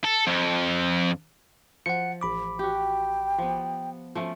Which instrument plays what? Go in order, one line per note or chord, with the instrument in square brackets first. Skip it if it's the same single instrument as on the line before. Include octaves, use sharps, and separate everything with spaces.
[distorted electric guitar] A4
F2
[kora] F3 [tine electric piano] F#5 C#7
[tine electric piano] A1 B5 D6
[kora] F#4 G4 [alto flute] G5
[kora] F3 B3
F3 A3 C#4